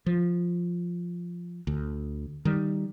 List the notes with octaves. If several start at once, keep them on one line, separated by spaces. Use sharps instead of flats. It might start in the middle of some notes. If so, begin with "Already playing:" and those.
F3
D2
D#3 G3